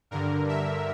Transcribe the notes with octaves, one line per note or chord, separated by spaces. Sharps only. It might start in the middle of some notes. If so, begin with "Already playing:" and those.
G2 D3 A#4
E5